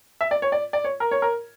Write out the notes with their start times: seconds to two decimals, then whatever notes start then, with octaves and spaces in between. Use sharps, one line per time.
0.21 E5
0.31 D5
0.42 C#5
0.52 D5
0.73 D5
0.84 C#5
1.00 A#4
1.11 C#5
1.22 A#4